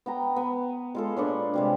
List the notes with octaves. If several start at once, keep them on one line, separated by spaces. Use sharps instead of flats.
B3 G5 A#5
B3
G#3 F4 A4
A#2 D4 B4 C#5
C3 G3 G#3